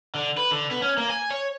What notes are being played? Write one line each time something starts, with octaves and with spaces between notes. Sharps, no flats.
D3
B4
D3
B3
C#4
A#3
G#5
C#5